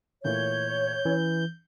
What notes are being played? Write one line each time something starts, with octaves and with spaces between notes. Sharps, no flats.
A#2 E3 A3 C#5 G6
E3 C#4